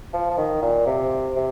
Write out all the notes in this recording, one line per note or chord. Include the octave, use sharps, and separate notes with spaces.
F3
F3
D#3
A#2
C3
C3